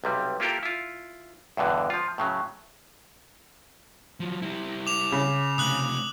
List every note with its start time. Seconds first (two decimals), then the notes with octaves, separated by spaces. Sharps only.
0.04 B1 C3 G3
0.40 A#3 E4 F4 G4 A4 A#4
0.63 E4 F4
1.57 E2 G2 B2 D3 E3
1.90 F3 F4
2.18 A2 C#3 F#3
4.20 F3 F#3
4.42 G3 E4
4.87 D6 F7
5.12 C#3
5.58 C3 A3 D#6 F#6 F#7